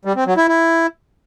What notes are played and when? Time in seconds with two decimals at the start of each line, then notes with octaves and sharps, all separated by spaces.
0.05 G3
0.16 C4
0.27 F#3
0.37 E4
0.48 E4